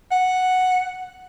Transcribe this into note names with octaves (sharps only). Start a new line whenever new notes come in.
F#5